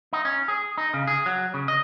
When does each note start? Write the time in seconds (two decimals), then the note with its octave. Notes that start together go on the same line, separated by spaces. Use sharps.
0.13 D#4
0.25 C#4
0.48 G#4
0.78 D#4
0.94 C#3
1.07 G#4
1.26 F#3
1.54 C#3
1.68 D#5